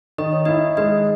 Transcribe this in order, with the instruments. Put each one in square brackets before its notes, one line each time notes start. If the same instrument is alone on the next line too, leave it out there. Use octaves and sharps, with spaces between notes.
[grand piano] D#3 [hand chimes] D#5
[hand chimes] C#5
[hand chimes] D#4 D#5 [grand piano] E4
[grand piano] G#3 [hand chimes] D#4 D#5